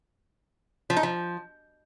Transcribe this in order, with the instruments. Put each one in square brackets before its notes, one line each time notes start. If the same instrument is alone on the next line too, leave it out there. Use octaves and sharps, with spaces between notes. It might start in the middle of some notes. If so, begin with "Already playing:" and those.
[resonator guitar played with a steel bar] F3
D#4
F3